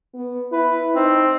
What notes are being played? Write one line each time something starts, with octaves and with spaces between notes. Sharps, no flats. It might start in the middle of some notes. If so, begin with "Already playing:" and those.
B3
E4 B4
C4 D#4